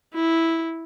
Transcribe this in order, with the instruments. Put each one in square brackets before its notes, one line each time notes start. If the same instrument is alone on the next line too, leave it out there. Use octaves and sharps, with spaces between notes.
[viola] E4